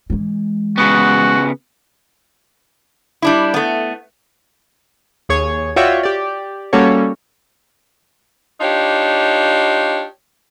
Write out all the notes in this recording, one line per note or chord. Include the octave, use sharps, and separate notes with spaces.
E3 G#3
C#3 B3 F#4
G3 D4 E4
A3 B3
D#2 G#4 C#5 G#6
F4 F#4 C#5 D5 E5 G5
G4 D5
G3 A#3 C#4 F#4 A4 C#5
D4 D#4 F4 G4 C#5